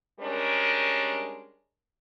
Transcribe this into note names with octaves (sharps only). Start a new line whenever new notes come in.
G3 G#3 C#4 D4 A#4